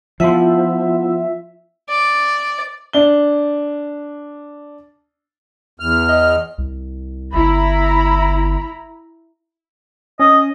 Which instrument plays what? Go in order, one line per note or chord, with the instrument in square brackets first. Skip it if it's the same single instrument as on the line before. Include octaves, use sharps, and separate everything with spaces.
[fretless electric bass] F3 [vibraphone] B3 E4 F#5 [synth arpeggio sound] F4 E5
[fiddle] D5
[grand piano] D4 G7
[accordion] E2 F6
[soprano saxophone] D#5
[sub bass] C2
[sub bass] G1 [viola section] E4 A#5 B5
[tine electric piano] C#4 [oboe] D#5